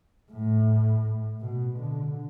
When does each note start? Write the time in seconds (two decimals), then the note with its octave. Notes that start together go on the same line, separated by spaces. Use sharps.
0.31 A2
1.40 B2
1.77 D3